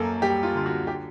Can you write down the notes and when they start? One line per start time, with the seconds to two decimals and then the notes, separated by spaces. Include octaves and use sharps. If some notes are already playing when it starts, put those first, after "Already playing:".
Already playing: F#2 A#3 A4
0.22 G3 G4
0.43 F4
0.55 D3 F4
0.66 F#4
0.87 G4